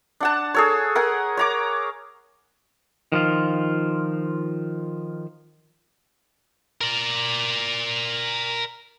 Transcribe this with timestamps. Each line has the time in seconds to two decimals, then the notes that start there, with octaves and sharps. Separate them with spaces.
0.20 D4 F#5 A5
0.54 G#4 A4 C#5
0.95 A#4 F#5 G#5
1.37 C#5 A#5 D6
3.12 D#3 F3 F4
6.81 A#4 D5